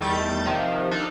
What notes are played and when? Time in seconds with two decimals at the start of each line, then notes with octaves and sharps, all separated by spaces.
0.01 E2 D#3 G3 A3 G6 A6
0.46 C3 D#3 F3
0.91 D4 D#4 F4 A4